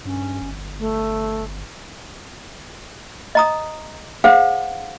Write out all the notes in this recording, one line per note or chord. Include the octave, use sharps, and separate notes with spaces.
G2 C#4
G1
A3
D#5 A#5 D#6
G#4 C5 F5 F#5